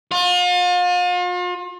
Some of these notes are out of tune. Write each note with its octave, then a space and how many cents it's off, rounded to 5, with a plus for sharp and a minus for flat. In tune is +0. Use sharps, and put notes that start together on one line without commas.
F4 +40